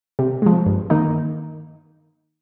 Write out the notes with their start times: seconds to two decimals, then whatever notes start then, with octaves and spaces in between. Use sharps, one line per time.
0.19 C3
0.42 F3 G#3
0.66 G2
0.90 D#3 A#3 D#4